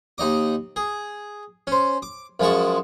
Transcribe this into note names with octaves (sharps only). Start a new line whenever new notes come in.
D#2 D#4 D#5 D6
G#4
C#4 C5
D6
F#2 F3 G#3 A5 C#6